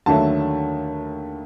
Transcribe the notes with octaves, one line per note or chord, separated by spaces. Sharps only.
D#2 D3 F#3 A3 A5